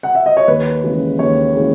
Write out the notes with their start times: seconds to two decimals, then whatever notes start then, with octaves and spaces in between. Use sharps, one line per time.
0.03 F#5
0.15 E5
0.26 D#5
0.37 C#5
0.48 D#2 B4
0.84 C#3 E3 G#3
1.19 D#2 C#5
1.55 C#3 E3 G#3